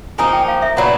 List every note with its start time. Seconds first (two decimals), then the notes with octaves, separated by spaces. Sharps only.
0.18 F3 A#3 D#4 G#5
0.33 G5
0.48 F5
0.62 E5
0.77 A#2 F#3 B3 D4 F#5